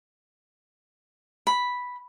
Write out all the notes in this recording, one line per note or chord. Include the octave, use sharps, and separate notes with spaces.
B5